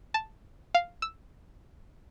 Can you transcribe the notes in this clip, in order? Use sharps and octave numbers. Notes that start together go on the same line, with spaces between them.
A5
F5
E6